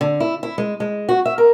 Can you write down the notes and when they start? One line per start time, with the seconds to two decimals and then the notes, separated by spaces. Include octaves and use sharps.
0.01 D3
0.20 E4
0.43 E4
0.58 G#3
0.80 G#3
1.09 F#4
1.25 E5
1.38 A#4